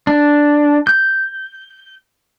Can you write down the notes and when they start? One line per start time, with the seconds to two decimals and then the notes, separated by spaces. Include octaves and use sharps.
0.07 D4
0.87 G6